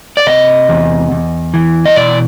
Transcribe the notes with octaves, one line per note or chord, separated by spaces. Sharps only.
D5
C3 D#5
E2
E2
E3
D#5
B2 D5